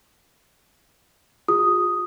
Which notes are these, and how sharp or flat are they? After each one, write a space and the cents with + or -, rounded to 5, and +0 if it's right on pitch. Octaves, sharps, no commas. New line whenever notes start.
F4 +35 G#4 -25 D#6 +0